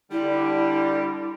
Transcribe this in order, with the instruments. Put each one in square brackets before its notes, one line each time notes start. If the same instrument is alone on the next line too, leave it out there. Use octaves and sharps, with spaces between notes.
[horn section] D3 G3 [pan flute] E4